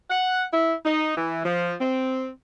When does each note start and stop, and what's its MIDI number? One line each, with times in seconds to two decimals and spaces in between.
0.10 0.44 78
0.52 0.73 64
0.85 1.14 63
1.17 1.43 52
1.45 1.73 53
1.80 2.28 60